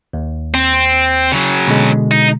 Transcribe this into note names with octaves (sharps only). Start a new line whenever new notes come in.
D#2
C4
C#3 F#3
B2 D3 G#3
D#4